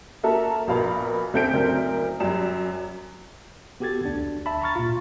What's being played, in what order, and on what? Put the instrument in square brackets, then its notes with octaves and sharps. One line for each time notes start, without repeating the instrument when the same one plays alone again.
[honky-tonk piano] A#3 F#4 A4 E5 A5 A#5
A#1 B2 A#4 F5 B5
D2 C4 A4 G6 B6 D7
F#1 D2 C4 A#4
F#2 G3 E7
[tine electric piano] B3 F#4 G4 A4 G#6 A6
D2 D4
E5 A5 B5
A#5 B5 C#6 F6 A6
A#2 F4